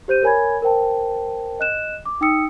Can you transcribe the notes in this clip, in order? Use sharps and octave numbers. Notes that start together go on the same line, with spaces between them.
G4 C5 G6 D#7
A#4 C#5 G#5 B5 G#6
A#4 C5 G5 A5
D#5 F#6 E7
D6
D#4 G5 D#6 E6 C#7